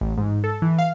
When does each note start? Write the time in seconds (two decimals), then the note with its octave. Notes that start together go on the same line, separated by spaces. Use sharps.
0.01 A1
0.17 G#2
0.44 A4
0.62 E3
0.78 F5